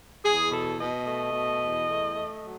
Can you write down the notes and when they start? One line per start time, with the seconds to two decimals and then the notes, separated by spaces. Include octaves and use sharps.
0.24 E2 G#4
0.51 B2 A4
0.79 B2 D#5
1.06 A3 D#5
1.33 B2
1.61 E2
1.88 A3
2.15 A3
2.43 F#3